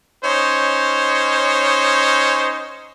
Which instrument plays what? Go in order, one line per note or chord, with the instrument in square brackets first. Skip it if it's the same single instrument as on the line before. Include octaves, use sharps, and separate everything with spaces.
[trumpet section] C#4 D#4 C5 C#5